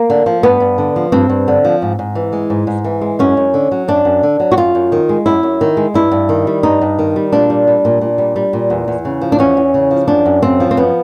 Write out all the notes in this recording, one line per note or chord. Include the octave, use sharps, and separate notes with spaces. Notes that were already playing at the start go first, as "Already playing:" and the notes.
Already playing: A#3
D3
F3
G2 B3
G2
D3
F3
G2 C4
G2
D3
F3
G#2
G#2
E3
G#3
G#2
G#2
E3
G#3
F#2 C#4
F#2
D3
F#3
F#2 D4
F#2
D3
F#3
F#4
F#2 F4
F#2
D#3
G#3
F#2 E4
F#2
D#3
G#3
G2 E4
G2
D#3
G3
G2 D#4
G2
D#3
G3
A#2 D4
G3
G3
A#2
A#2
G3
G3
A#2
E2
E2
C#3
F3
D4
E2 C#4
E2
C#3
F3
F#2 D4
F#2
C#3 C4
F3
C4
F#2 B3